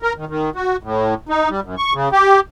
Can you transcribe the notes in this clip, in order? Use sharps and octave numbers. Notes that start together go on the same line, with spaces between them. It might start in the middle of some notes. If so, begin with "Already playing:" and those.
A#4
D#3
D#3
F#4
A2
D#4
G3
F#2
C#6
C#3
G4